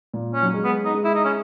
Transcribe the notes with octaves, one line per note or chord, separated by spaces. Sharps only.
A#2
C#4
F#3
G#3
B3
D#4
G#3
E4
D#4
C#4